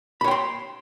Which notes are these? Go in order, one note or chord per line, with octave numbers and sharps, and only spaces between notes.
C#5 G5 B5 C6